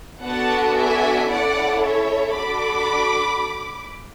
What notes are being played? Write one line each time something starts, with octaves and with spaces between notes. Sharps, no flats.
B3 D4 F#4 A4 F#5 A5
E5 G#5
C#4 E4 A4 D5 F#5
C#5 E5
D4 F#4 A4 B5 D6